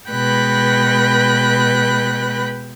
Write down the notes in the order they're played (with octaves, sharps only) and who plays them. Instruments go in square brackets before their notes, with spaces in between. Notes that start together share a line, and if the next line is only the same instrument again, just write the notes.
[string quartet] B2 G#3 B4 G5 B5 F#6